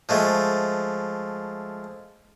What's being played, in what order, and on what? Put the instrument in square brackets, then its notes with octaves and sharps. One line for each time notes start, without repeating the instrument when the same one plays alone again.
[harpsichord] F3 G#3 A3